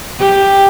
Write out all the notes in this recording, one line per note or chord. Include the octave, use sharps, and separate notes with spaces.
G4